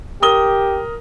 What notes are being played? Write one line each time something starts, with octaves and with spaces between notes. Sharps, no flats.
G4 A#4 D#6 G7